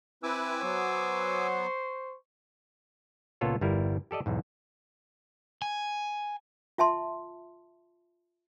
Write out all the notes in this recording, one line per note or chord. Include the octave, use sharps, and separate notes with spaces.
C4 E4 B4 G#5 D6 E6
F#3 B3 C5 C#6
C#2 A#2 B3 F4 A4 C#5
G1 E2 G3 E4 A#4
G4 A4 D5 D#5
B1 E2 G#2
G#5
F4 E5 A5 C6